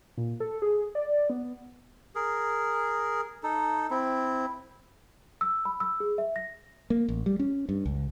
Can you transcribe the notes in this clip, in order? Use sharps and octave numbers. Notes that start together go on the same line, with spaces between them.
A#2
A4
G#4
D5
B3
G#4 A#4
D#4 A4
C4 E4
E6
B5
E6
G#4
E5
A#6
A#3
A1
G3
C#4
G2
C#2